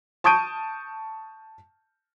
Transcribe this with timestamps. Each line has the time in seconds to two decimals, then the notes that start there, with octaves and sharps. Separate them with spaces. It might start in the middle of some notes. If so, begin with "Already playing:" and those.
0.24 A5 C#6 D#6 G6 D7 D#7